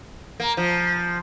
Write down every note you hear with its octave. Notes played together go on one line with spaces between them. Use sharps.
A#3
F3